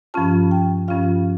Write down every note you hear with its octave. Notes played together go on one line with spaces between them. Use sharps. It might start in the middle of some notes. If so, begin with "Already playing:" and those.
G2 F3 C#4 F4 A5
G5
G2 F3 C#4 F4 F5